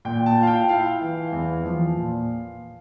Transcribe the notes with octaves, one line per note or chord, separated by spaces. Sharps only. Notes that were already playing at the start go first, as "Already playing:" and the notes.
A#2 G5
A5
F4
F5
G5
E4 F5
E3
E2
F3
A#2